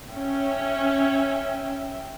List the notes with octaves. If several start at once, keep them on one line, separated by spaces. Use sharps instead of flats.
C#4 E5 G5